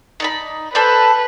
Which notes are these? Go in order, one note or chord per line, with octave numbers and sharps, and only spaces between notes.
D#4 D5 B5
A4 B4 C5 D5